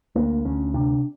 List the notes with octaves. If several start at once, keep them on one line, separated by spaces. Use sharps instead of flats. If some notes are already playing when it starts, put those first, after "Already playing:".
D2 A#3
D2 C#4
C3 D4